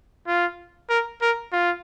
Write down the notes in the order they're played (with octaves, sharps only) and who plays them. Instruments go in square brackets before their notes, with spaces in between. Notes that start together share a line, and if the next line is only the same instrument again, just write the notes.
[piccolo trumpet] F4
A#4
A#4
F4